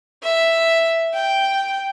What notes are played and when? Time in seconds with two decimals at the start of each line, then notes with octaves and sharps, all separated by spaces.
0.23 E5
1.14 G5